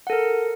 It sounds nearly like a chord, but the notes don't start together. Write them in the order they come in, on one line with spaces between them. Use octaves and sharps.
F#5 A4 A#4